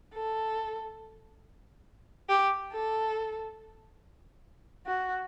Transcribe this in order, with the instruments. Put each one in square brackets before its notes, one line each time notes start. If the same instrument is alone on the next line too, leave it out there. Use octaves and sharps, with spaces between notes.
[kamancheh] A4
G4
A4
F#4